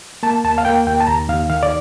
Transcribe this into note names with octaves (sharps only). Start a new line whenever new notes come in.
A#3 A5
D#2 A5
F5
A#3 G5
D#2 G5
A5
D#2 A#5
D#2 F5
D#3 F5
D5